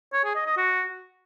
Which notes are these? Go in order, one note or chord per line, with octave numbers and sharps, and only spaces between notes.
C#5
G#4
D#5
D#5
F#4